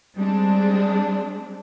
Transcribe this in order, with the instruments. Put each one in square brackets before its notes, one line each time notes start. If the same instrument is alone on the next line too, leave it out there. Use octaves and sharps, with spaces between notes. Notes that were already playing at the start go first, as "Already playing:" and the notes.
[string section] G3 G#3 C4 D4